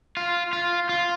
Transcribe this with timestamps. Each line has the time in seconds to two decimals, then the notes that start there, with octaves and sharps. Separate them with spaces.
0.17 F4
0.53 F4
0.89 F4